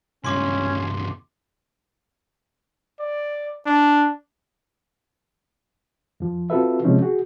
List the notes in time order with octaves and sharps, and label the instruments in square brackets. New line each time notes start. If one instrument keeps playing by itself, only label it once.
[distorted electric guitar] C#2 G2 [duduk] C#4 [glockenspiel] C6 D6
[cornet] D5
D4
[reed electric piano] F2 F3
C4 F4 F#4 A4 B4 E5
C3 F3 G#3 C4 C#4 D#4
F#4 G#4